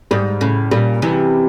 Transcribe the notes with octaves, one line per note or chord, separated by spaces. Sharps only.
G#2 G3
A2 C#3
A#2 G3
C3 E3